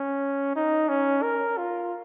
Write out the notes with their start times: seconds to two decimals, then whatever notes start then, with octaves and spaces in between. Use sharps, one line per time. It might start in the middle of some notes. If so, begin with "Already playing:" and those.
Already playing: C#4
0.56 D#4
0.89 C#4
1.23 A#4
1.58 F4